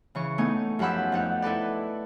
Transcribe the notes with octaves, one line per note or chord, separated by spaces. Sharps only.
C#3 E3 C#6
A3 B3 D#4 G#5
F#2 F3 G4 F#5 B5 E6
F2 D#4 F#5
E4 A4 B4 D5